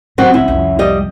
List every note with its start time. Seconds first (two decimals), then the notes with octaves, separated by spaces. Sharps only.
0.18 C#3 F#3 C4 F#4
0.34 C2 C#4 E4
0.48 C2 F2
0.79 G3 D#5